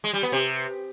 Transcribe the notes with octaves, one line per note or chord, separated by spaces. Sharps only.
G#3
G3
B3
C3